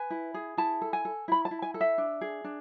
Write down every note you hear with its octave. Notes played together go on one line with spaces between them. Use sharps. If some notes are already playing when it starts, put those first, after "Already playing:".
Already playing: B4 G#5
E4
G#4
E4 A5
A4
G#5
A4
E4 B5
A5
E4
G#5
A4
E5
D4
G#4
D4